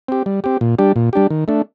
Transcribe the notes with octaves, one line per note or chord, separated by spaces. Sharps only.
C4 G4
G3
C4 G4
A#2
G3 D4 G4
A#2
G3 D4 G4
D#3
A3 D4